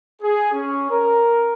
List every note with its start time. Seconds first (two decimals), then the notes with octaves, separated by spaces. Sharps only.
0.22 G#4
0.53 C#4
0.90 A#4